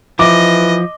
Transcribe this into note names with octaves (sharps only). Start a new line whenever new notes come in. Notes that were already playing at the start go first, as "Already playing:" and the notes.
E3 F3 D#5 D6